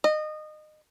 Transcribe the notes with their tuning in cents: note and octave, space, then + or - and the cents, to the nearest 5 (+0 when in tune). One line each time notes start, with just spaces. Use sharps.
D#5 -25